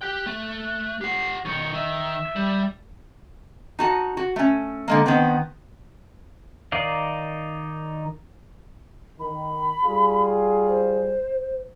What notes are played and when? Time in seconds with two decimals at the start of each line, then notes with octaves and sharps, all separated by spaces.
0.01 G4 G5 F#6
0.26 A3
1.01 G4 F#5 C7
1.45 B1 D#3 C#6
1.73 D#3 E5
2.36 G3
3.79 D#4 F#4 A5
4.17 F#4
4.36 A3 C#4
4.88 D3 G#3 A#3
5.06 D#3 B3 C4
6.72 D#3 D#4 D5 F5
9.20 D#3 B5
9.84 G3 F4 G#4
10.68 C5